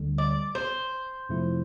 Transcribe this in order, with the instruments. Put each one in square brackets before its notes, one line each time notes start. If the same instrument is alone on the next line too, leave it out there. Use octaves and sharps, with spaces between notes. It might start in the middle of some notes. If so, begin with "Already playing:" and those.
Already playing: [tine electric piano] D2 D3 G3
[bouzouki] D5
C5
[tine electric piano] F2 C3 F3 A3 E4